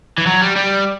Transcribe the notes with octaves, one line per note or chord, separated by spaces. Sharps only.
E3
F#3
G3
G3